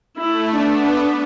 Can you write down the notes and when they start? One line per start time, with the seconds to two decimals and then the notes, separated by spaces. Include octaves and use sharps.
0.17 A3 E4
0.56 B3 D4